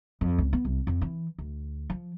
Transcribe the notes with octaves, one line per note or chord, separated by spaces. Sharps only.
F2
C#2
B3
C2
F2
E3
D2
F3